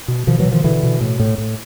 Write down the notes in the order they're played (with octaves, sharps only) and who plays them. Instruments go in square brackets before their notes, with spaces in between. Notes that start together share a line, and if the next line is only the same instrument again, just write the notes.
[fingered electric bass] B2
B2 D#3 F3
E3 F#3
B2
D#3 F3
B2 D3 E3
B2
A2
A2
A2